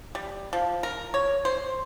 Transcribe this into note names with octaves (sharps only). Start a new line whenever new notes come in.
G3
F3
A#4
C#5
C5